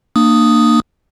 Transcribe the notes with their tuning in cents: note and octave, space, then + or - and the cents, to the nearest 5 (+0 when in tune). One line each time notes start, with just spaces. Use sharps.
A#3 -15 D4 +35 D#6 +0